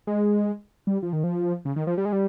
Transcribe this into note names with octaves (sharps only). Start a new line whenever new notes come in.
G#3
G3
F3
D#3
F3
C#3
D#3
F3
G3
G#3
G3